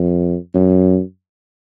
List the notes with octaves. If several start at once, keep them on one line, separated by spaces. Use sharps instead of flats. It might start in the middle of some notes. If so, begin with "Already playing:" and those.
Already playing: F2
F#2